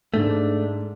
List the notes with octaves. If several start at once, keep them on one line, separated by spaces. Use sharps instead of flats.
G#2 A3 D4